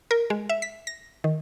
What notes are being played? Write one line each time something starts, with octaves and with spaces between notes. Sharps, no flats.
A#4
G#3
E5
B6
A#6
D#3